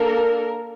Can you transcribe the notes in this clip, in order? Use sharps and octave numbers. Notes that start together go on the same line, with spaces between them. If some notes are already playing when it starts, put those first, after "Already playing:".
Already playing: A#3 D4 A4 A#4